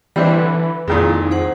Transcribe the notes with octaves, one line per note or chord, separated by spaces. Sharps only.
E3 G3 C4 D4 B4 B5
D3
F2 A#2 D#3 G#3 C4 D#4 E4
G#4 C5 F#5